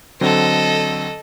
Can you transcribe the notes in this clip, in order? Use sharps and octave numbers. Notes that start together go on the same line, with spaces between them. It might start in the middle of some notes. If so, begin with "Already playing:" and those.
D3 F#3 C4 A4 D#5